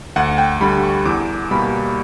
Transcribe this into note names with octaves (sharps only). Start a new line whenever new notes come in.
D2 F#5
G5
D3 G3 B5
C#6
E2 D6
B2 G3 A#3 B5